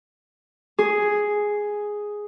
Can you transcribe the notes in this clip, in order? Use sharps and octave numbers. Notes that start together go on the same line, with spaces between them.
G#4